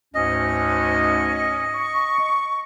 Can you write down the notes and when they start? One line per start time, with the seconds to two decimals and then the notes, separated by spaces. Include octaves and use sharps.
0.15 D2 G#2 C#4 D#5
1.75 C#6